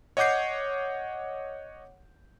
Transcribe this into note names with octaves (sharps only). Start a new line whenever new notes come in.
C#5 D#5 F#5 D6 G6 C7